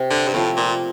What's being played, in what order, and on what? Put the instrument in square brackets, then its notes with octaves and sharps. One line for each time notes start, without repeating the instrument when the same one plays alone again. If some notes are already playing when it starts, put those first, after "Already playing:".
Already playing: [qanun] C3
[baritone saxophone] D3
G2
[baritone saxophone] A2 [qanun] F3 A3 C4
[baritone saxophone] A#2